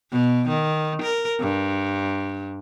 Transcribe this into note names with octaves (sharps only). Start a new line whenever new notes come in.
B2
D#3
A#4
G2